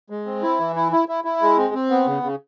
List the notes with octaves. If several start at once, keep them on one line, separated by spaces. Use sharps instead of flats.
G#3
C4
E4
E3
E4
E4
E4
E4
G#3
C4
C4
B3
C#3
C#3